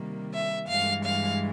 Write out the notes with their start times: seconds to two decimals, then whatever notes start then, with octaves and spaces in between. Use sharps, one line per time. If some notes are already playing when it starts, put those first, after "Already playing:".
Already playing: C3 D#3 G3 A#3
0.33 E5
0.69 G2 E3 G#3 F5
1.05 F5